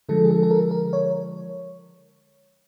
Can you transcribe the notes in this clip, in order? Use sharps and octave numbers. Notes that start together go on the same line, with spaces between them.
D3 F3 G#3 A4
G#4
A4
A4
A#4
A#4
C#5